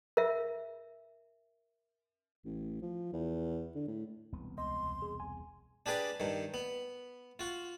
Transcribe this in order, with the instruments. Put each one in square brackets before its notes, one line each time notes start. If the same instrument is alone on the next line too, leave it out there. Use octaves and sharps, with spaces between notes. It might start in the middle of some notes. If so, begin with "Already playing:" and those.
[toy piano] A#4 E5
[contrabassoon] A1
F3
E2
D3
A2
[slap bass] E1 C2 B3
[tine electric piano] C#2 D#5 [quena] C6
[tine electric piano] G#4
G#5
[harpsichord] D4 G4 G#4 B4 D5
G2 D#3
B3
F4 F#4